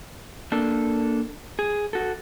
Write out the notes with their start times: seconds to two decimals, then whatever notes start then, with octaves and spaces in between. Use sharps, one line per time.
0.52 A#3 D4 A4
1.59 G#4
1.93 F#4 A4